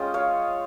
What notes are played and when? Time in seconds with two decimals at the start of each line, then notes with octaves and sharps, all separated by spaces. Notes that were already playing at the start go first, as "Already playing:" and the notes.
Already playing: G#3 C#4 F4 D#5 G5
0.14 C#5 F5